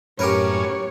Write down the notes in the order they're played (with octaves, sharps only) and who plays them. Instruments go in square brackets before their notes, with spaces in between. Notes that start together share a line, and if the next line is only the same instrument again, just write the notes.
[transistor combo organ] F#2 A2 C#4 [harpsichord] G4 A#4 B4 [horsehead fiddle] C#5